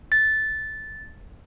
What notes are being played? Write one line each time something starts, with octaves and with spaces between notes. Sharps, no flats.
A6